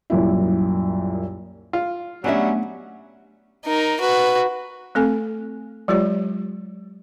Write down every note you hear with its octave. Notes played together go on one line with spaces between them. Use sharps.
C2 F#2 A#2 E4
F4
F#3 G3 A3 B3 C#4 D4 D#5 E5
D#4 A#4
F#4 B4
A3 C4 A4 G#5
F#3 G#3 F4 G4 C#5